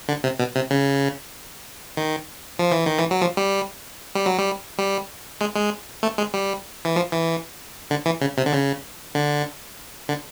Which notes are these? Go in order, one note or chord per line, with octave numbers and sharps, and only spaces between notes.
D3
C3
B2
C3
C#3
D#3
F3
E3
D#3
E3
F#3
F3
G3
G3
F#3
G3
G3
G#3
G#3
A3
G#3
G3
E3
F3
E3
D3
E3
C#3
C3
D3
C#3
D3
D3